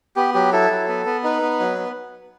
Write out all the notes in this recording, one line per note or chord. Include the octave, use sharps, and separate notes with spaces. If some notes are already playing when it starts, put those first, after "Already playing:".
B3 G4
F#3 G4
E4 A4
F#3
B3
B3
D#4 B4
B3
F#3
B3